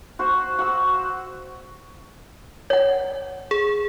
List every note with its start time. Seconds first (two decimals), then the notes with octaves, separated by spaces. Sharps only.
0.19 F#4 C5 C#6
0.59 F#4 F#5 E6
2.70 C#5 F#5
3.51 G#4